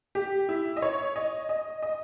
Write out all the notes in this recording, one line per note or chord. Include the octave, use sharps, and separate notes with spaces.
G4
E4
D#5
C#5
D#5
D#5
D#5